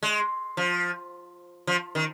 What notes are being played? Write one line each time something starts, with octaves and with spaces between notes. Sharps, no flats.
G#3
F3
F3
D#3